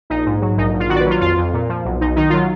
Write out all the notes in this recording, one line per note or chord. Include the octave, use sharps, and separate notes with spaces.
A#1 D#4
G#2
F#3
A#1 D#4
A#1
F4
D#3 F#4
D5
B4
F#3 F4
F2 F4
F2
A#2
F3
B1
B1 D#4
D#3 D#4
F#3 F4